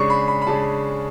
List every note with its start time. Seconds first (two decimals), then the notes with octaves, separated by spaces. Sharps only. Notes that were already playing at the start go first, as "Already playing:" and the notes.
Already playing: C#3 G#3 D4 C#6
0.10 B5
0.28 B5
0.42 B5
0.47 C#3 G#3 D4 A5